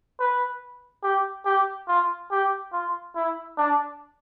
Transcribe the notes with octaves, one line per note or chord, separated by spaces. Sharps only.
B4
G4
G4
F4
G4
F4
E4
D4